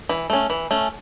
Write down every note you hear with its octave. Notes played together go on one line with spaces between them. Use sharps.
E3
A3 C#4
E3
A3 C#4